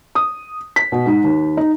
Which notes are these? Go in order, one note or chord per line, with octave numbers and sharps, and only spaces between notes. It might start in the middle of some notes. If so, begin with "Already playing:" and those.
D#6
B6
B2
G#2
D#2
D#4